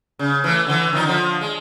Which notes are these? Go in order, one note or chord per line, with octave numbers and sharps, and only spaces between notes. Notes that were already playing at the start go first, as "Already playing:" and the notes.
C#3
E3 A3
D3 E3
D#3 F3 D#4
D3 F3
G#3